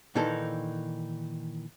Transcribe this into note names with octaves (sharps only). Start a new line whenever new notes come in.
A#2 D#3 E3 D#4 A4